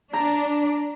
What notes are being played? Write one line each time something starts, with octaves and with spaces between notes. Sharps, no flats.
D4 A#5